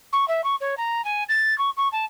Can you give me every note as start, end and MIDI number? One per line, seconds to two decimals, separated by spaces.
0.12 0.27 85
0.28 0.43 76
0.44 0.55 85
0.60 0.74 73
0.77 1.03 82
1.04 1.23 80
1.28 1.56 93
1.58 1.70 85
1.77 1.88 85
1.92 2.04 81